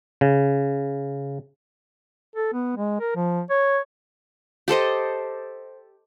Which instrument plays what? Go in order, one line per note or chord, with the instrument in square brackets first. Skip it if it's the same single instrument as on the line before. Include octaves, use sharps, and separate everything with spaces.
[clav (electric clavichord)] C#3
[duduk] A4
B3
G#3
A#4
F3
C#5
[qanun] G4 A4 C5 D#5